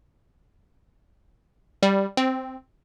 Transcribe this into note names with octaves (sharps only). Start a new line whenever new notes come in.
G3
C4